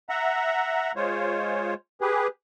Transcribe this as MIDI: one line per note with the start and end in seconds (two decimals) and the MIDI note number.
0.09 0.92 76
0.09 0.92 78
0.09 0.92 82
0.96 1.74 56
0.96 1.74 65
0.96 1.74 72
0.96 1.74 73
2.01 2.28 67
2.01 2.28 68
2.01 2.28 71